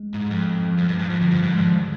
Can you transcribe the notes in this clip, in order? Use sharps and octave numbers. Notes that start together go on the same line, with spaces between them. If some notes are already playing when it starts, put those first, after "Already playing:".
Already playing: G#3
G#2
F2
F3
F2 G3
G2
G#2
F2 F3
F2 D3
G2 D#3
G#2 G3
G#3
F2 G3
G3